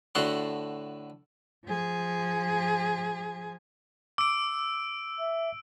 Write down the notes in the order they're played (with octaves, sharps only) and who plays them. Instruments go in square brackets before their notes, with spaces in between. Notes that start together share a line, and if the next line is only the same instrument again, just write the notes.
[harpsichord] A2 D3 F#4 A4 F#5 C6
[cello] F3 G#4
[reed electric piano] D6 [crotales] E6 D7
[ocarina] E5